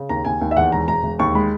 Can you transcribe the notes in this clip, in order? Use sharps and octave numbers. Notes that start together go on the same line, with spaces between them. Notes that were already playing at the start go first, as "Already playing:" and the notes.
Already playing: C#3
D#2 A#5
D#2 G#5
D#2
E5
E2 F#5
E1 A#5
E1 A#5
E1
D#2 C#6
G#3 B5